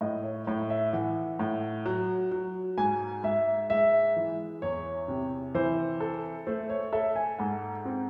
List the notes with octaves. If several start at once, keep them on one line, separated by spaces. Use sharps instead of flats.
A2 D#5
C#5
A2 C#5
E5
E3 F#5
A2
F#3
F#3
G#2 G#5
G#2 E5
G#3 E5
E3
E2 C#5
C3
E3 C5
A4
A3 C5
C#5
A4 E5
G#5
G#2 F#5
C4